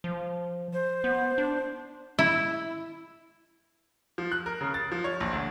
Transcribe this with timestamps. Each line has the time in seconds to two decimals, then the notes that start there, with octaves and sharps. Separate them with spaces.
0.04 F3
0.73 C5
1.04 B3
1.38 D4
2.19 E4
4.18 F3
4.32 F#6
4.46 A#4
4.61 C#3
4.74 A6
4.92 F3
5.04 C#5
5.20 A#1
5.33 D2